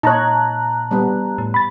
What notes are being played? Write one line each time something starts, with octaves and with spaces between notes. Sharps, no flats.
A#2 D#4 C#5 A5 A#5 F#6
G3 B3
A2
B5 A6